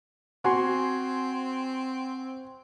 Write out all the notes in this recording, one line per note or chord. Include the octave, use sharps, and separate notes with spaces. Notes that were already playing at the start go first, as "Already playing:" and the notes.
C4 F#4 F#5 G#5 C6